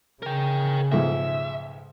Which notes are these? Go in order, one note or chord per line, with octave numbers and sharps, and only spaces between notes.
C#3 A#4 G5
B1 G#2 F3 E5